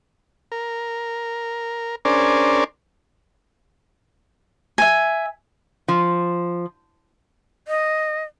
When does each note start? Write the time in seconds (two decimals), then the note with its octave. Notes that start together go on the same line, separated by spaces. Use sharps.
0.52 A#4
2.05 C#4 D4 G#4 A#4 C5 D5
4.78 E5 G#5
5.88 F3
7.68 D#5